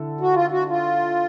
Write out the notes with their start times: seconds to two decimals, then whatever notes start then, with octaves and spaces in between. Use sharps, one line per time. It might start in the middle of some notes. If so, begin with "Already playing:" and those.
Already playing: D3 E4 A4
0.21 F#4
0.34 F4
0.52 F#4
0.69 F4